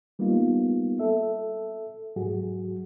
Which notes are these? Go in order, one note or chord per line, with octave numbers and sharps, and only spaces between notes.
G3 A#3 B3 D#4 F4
A4 E5
G#2 F#3 F#4 G#4